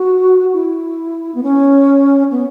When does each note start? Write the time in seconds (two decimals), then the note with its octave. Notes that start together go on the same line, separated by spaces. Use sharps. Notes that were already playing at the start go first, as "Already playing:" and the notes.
Already playing: F#4
0.53 E4
1.35 B3
1.43 C#4
2.31 B3